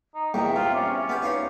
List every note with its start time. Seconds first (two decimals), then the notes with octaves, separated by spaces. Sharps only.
0.15 D#4
0.34 A#1 E2 G3 D#4 E5 G5
0.56 C3 F4
0.74 C#4 D5
1.09 B3 G4
1.22 D#4 F4 C#5